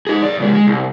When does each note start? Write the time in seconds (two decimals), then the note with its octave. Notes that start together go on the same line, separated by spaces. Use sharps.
0.07 D#4 G#4
0.22 F#2 D5
0.40 C2 G#3
0.54 G#3
0.67 C2